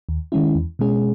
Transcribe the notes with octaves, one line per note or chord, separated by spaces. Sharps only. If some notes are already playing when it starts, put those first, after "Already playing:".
D#2
D#3 G#3 C#4 E4
E2
B2 G#3 C#4 G#4